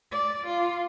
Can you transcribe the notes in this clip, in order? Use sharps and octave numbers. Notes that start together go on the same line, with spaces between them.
D5
F4